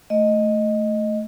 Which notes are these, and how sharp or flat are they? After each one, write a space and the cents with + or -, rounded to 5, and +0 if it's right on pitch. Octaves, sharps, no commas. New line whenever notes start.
A3 +0 D#5 +0